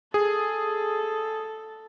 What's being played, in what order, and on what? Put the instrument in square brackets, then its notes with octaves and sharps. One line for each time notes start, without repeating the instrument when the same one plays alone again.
[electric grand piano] G#4 [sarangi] A4